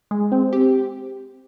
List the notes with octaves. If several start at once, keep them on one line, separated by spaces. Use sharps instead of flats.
G#3
C4
G4